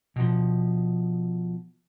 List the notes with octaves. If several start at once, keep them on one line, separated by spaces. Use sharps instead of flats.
B2 F3